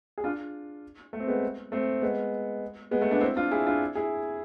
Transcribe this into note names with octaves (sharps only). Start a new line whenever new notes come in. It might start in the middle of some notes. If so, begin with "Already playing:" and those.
G#4
D4 F4
A3
C4
G#3 B3
A3 C4
G#3 B3
G#3 B3
A3
B3 D4
C4 E4
D4 F4
E4 G#4
D4 F4
E4 G#4